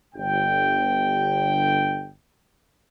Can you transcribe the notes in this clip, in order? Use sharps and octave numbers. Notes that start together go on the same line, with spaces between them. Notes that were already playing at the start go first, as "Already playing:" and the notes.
G1 G5